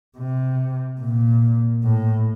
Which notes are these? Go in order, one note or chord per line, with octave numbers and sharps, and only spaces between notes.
C3
A#2
A2